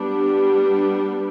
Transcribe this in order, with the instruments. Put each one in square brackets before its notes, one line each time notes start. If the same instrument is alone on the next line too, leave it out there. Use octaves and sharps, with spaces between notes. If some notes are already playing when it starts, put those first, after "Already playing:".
Already playing: [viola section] G3 B3 D4